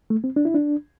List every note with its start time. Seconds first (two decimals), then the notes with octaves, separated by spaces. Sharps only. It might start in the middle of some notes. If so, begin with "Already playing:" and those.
0.10 A3
0.24 C4
0.36 D4
0.45 E4
0.54 D4